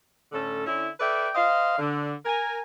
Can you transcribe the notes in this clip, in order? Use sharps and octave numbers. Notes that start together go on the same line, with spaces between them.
A2 D3 C#4 A4
D3 C#4 E4
A4 B4 D5 E5 G5
C5 D#5 F5
D3
A#4 G#5